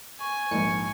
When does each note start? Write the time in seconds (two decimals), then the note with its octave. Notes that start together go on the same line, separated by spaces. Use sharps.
0.20 G#5 C#6
0.51 A#1 G#2 C#7